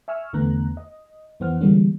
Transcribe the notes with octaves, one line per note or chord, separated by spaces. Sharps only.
E5 G#5 C#6 E6 F6
E2 D3 A3 B3 A#5 F#6
D#5
F2 E3 B3 C5 F#5 F6
D3 E3 G3 G#3 A#3 C#4